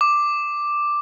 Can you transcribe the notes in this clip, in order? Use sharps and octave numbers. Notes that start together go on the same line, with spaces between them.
D6